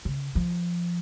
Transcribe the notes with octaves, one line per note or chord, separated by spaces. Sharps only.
C#3
F3